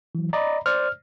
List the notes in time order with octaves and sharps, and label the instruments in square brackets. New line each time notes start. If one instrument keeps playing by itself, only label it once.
[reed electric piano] E3 F#3
[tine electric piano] D5 D#5 [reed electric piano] A#5 B5
[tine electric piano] C5 D5 [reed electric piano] F6